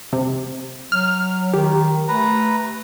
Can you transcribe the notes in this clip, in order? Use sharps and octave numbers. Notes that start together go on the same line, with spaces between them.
C3
F#3 F6
D#3 G4
A3 B4 A#5